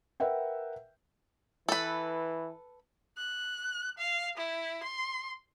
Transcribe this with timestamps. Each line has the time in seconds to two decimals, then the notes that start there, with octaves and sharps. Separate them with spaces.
0.20 A#4 B4 E5 F#5 G5
1.69 E3 A4 B4
3.17 F#6
3.98 F5
4.38 E4
4.84 C6